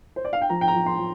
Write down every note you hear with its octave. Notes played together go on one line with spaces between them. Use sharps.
C5
D5
F5
G5
F3 A#5
G5
A#5
F3
C6
F3